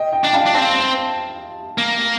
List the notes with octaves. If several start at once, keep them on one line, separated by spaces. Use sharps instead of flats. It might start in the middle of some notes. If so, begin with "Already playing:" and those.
Already playing: D#5 G5
D#5 G5
D4 G5
F5 A5
D4
C4 F5 A5
A#3